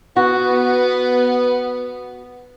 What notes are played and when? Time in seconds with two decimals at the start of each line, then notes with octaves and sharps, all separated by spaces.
0.17 B3 F#4